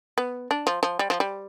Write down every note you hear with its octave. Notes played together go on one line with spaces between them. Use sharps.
B3
D4
F3
F3
G3
F3
G3